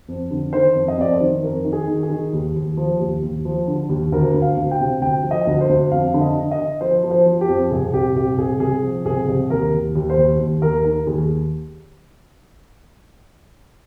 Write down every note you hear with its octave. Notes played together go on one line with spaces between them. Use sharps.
F2
D3
D#3 C5
F2
D#5
F2 D5
C5
D#3
F2 A#4
D#3
G#4
D#3
G#4
D#3
D#2
D#2
F3
D#2
D#2
F3
D3
D#2
D2 A#4
D2
F5
D2
G5
C3
D2 G5
F3
D#5
D2
C5
D2
F2 F5
D3
D#5
D3
D#5
D3
F3 C5
F3
C5
F3
G4
F2
C2 G#4
C2 G4
C2 G4
C2 G#4
C2 G#4
F3
C2 G#4
C2
D#2 A#4
D#2
D#2
C5
D#2
D#2
D#2 A#4
D#3 A#4
D#2 G#4